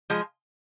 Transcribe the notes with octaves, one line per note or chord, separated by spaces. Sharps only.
F3 G#3